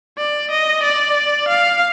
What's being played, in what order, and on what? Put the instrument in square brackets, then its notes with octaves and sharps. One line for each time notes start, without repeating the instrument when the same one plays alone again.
[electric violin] D5
D#5
D5
F5